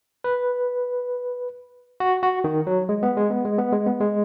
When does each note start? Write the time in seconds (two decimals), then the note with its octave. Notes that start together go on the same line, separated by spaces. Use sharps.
0.24 B4
2.00 F#4
2.23 F#4
2.44 D#3
2.67 F#3
2.89 G#3
3.03 B3
3.17 G#3
3.30 B3
3.45 G#3
3.58 B3
3.72 G#3
3.86 B3
4.00 G#3